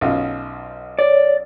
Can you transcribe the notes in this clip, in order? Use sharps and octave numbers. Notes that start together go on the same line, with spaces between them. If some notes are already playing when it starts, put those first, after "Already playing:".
B1 F#2 F4
C#5 D5